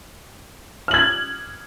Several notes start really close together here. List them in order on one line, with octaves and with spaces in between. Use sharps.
F6 F#7 G#6